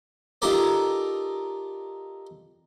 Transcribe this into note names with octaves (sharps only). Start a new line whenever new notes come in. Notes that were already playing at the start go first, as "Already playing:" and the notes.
D#4 F4 G4 A4 A#4 D5